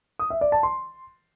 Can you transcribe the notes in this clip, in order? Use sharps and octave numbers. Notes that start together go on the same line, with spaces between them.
D#6
E5
D5
A5
C6